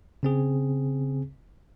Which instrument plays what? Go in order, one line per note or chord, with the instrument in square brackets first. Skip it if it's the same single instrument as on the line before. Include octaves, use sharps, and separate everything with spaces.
[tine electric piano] C#3 C4 G#4